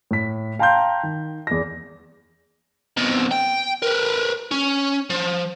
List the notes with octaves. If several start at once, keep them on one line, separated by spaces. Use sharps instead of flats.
A2 B6
F5 G5 A5 A#5 C6 G6
D#3
E2 A#6
F2 B2
G5
A#4 B4
C#4
F3